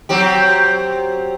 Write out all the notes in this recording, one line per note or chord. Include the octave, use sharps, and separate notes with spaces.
F#3 C4 G4